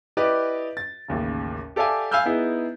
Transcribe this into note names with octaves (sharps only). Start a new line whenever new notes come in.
E4 G4 B4 D5 D#5
A6
A1 D#2 C#3
G4 A4 D5 E5 F5 G#5
F5 G#5 B5 E6 F6 G6
B3 D#4 E4 G#4